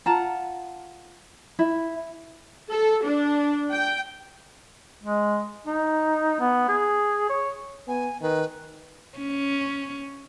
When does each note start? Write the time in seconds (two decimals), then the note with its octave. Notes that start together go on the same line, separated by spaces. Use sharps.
0.06 F4 F#5 A5 A#5
1.59 E4
2.71 A4
3.06 D4
3.71 G5
5.02 G#3
5.67 D#4
6.40 B3
6.69 G#4
7.30 C#5
7.88 B3 G#5
8.22 D#3 B4
9.18 C#4